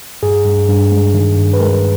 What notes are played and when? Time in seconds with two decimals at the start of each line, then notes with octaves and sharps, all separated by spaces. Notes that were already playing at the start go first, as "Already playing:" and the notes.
0.23 G2 G#4
0.45 G2
0.69 G2
0.92 G#3
1.14 D#3
1.37 G2
1.53 B4
1.60 G#3 A#4